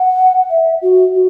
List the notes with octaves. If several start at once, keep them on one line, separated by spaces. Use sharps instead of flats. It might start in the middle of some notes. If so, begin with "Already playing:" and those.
Already playing: F#5
E5
F#4
F#4